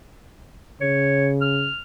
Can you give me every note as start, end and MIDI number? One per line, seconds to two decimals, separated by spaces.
0.81 1.69 49
0.81 1.29 73
1.42 1.82 89